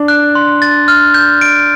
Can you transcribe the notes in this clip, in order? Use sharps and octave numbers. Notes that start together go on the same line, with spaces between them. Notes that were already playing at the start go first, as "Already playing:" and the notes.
Already playing: D4
F#6
C6
A6
F6
G6
D7